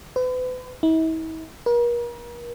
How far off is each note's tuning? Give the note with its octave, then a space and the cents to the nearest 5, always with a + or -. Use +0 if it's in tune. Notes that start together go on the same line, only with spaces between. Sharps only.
B4 +40
E4 -45
A#4 +40